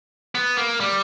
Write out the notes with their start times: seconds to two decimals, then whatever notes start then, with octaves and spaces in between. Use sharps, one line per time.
0.35 B3
0.57 A#3
0.80 G3